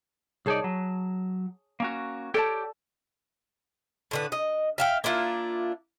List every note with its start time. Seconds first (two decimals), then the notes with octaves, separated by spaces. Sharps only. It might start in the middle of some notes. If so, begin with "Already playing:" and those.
0.46 C2 D#4 G#4 C#5 D5 A5
0.64 F#3
1.80 A#3 C#4 F#4
2.34 G4 A4 C#5 D5 G5 A5
4.11 A2 D3 B4
4.32 D#5
4.78 E5 F5 G5
5.04 A#3 D4 E4 F4